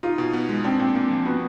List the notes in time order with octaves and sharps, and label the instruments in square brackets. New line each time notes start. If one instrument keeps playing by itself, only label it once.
[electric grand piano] D#4 [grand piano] F4
[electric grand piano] B2
B3
G#3
[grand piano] C4 [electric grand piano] D4
[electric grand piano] A#2
A#3
F3
[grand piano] B3 [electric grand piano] F#4